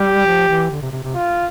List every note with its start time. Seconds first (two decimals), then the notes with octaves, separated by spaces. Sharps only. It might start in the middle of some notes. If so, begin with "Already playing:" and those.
Already playing: G3 G4
0.26 F3
0.47 E3
0.71 D3
0.82 C3
0.92 C3
1.03 C3
1.15 F4